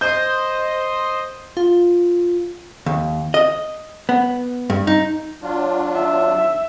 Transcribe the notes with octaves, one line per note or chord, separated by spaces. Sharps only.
C5 D#5 G6
F4
D#2
D#5
B3
G2
D#4
F#3 D4 F4
E5